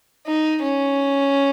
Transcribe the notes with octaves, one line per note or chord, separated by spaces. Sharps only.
D#4
C#4